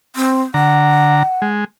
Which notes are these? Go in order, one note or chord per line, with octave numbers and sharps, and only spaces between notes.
C4
D3 F#5 A#5
G#3